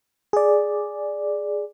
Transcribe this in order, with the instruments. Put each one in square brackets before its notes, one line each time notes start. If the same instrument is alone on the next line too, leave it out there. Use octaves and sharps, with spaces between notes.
[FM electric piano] G#4 D5